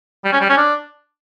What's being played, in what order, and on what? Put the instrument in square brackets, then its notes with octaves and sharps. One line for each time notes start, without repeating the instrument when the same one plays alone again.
[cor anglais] G3
C#4
G3
C#4
D4